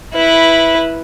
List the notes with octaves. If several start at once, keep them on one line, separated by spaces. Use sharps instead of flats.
E4 B4